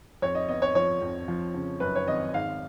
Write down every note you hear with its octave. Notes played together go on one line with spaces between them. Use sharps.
F2 C#5
D#5
B3 D#5
C#5
F3 C#5
F2
F3
C#3
F#2 B4
C#5
G#1 D#5
G#2 F5